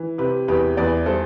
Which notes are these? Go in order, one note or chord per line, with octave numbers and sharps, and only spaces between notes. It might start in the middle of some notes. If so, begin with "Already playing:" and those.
Already playing: E3
C3 G4 B4
E2 G4 B4
E2 B4 D5
G3 A4 C5